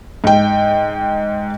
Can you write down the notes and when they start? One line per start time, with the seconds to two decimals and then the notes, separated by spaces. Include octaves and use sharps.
0.24 G#2 G5